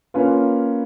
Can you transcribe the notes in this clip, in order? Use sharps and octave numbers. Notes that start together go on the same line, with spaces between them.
A#3 C#4 F4 B4